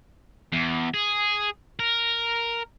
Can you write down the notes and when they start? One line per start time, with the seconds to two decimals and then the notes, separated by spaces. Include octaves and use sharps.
0.53 E2
0.94 G#4
1.79 A#4